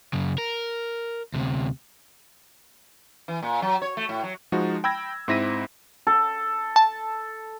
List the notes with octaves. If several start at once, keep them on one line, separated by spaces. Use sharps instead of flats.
F#2 C#3
A#4
D2 C3
E3
A#2
F#3
C#5
A3
A2
F#3
F3 G#3 D#4 F#4
G5 B5 E6 G#6 A#6
G#2 C4 E4 A#6 B6 D#7
A4
A5